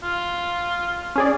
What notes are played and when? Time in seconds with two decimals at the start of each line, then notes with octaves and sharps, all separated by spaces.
0.03 F4
1.16 C#4 G#4 D5